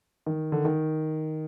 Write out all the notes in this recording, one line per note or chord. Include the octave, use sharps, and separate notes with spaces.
D#3
D3
D#3